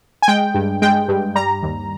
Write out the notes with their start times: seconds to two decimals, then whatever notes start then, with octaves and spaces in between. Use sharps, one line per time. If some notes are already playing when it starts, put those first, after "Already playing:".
0.22 G#5
0.28 G#3 G5
0.54 G2
0.82 G#3 G5
1.08 G2
1.35 G3 A#5
1.62 D#2